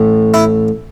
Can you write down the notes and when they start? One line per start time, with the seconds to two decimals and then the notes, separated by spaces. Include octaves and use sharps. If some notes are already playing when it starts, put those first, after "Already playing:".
Already playing: A1 A2
0.34 E4